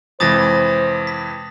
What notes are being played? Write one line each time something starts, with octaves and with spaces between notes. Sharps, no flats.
F2 C3 E3 G#3 C5 D#6 A6 A#6
B6